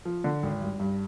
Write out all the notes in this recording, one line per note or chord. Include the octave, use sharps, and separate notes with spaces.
F3
D3
G#1
G2
G2